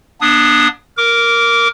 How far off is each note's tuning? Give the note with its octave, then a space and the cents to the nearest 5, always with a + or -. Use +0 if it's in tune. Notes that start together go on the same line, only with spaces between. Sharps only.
B3 -45 D4 +10 D#6 +0
A#4 +0 D6 -20